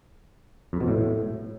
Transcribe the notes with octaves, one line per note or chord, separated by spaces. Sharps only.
F2
B2
A2